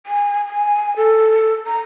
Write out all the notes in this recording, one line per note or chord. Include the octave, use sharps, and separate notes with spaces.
G#5
G#5
A4
A#5